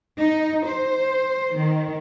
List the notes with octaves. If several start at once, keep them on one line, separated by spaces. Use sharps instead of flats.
D#4
C5
D#3